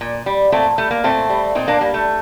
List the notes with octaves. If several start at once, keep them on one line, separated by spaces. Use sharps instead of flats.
A#2
G3
A#2 A3 C4
G3 A3
A#3
A#2 A3 C4
G3
A#2 C4 D#4
A#3 D4
G3 A#3
A3